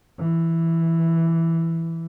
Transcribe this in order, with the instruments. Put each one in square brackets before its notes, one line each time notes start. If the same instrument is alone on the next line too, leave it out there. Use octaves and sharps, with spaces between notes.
[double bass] E3